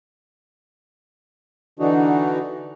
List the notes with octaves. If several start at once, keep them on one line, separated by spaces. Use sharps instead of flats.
D3 E3 D4 D#4 F#4